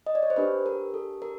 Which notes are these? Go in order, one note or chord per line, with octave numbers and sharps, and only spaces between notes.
D#5
D5
C#5
C5
D4 G4 B4
A#4
A4
A#4